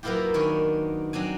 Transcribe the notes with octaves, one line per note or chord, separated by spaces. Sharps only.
F#3 A#3 B3 E4 F4 G4
D#3 D4 C#5 G#5
F#3 C4 D4 G#5